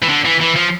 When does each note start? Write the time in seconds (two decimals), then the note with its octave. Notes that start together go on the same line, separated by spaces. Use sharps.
0.02 E3
0.09 D3
0.25 E3
0.41 E3
0.56 F3